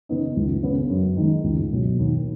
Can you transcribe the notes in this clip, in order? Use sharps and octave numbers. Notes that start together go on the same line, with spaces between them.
C#3 B3 D#4
C#2
C#3 B3
F#2
D#3 G#3
C#2
B2 F#3
D#2